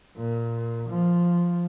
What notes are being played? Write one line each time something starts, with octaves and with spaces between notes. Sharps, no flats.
A#2
F3